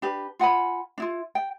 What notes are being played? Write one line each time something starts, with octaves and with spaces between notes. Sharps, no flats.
D4 G4 B4
F4 F#5 G#5 B5
D4 E4 F4
G5